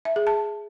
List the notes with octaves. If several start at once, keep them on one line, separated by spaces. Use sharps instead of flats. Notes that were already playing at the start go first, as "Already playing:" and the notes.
E5
G#4
A5